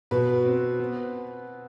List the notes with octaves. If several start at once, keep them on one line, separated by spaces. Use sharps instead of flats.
B2 B4
C4
B3